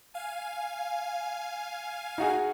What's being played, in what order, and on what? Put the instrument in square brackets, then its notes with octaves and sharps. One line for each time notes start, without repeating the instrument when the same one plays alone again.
[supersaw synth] F5 G#5
[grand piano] D#4 F#4 G#4